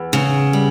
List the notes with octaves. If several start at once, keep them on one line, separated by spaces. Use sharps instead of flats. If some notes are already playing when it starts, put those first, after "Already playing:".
Already playing: E2
C#3
G3